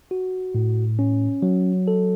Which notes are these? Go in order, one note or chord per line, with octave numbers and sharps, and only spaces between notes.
F#4
A2
C#4
F#3
A4